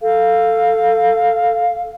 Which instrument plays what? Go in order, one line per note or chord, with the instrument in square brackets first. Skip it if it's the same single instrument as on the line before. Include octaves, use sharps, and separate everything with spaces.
[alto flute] A4 [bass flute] F5